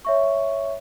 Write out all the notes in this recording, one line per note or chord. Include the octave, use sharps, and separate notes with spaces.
C#5 E5 C#6